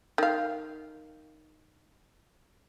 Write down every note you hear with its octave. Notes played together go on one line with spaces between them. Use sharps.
D#3 F5